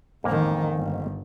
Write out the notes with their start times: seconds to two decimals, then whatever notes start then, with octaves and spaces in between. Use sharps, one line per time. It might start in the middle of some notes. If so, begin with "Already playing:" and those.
0.24 A1 F2 G#2 D#3 A#3
0.73 G1